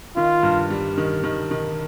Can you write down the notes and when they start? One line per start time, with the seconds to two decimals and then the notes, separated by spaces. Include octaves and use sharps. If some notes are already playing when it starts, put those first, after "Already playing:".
0.16 D#3 F4
0.43 G2
0.70 G3
0.97 D#3
1.23 D#3
1.51 D#3